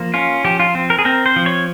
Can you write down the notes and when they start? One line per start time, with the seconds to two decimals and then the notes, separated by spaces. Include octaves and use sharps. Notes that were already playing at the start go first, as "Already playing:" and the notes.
Already playing: F3 A#3
0.14 C#4 F4
0.45 F3 G4
0.60 F4
0.75 C4
0.90 A#4
0.99 G#4
1.05 C4 A#4
1.26 C5
1.36 F3
1.46 C#5